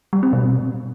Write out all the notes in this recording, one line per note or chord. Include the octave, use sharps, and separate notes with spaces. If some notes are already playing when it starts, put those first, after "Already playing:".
G3
C4
B2